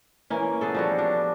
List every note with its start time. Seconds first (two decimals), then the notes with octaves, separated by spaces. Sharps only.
0.30 E3 A#3 C#4
0.61 B3 G#4 A4
0.74 F3 G3 F#4
0.98 D4